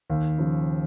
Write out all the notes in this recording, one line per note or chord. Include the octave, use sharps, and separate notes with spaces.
D#2
C#3 F3